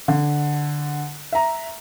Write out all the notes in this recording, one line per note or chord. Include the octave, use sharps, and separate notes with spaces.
D3
E5 A#5